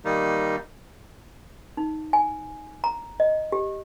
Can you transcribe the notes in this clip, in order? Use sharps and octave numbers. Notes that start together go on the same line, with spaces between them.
D#3 G3 A#3 D#4
D#4
G#5
A#5
D#5
G4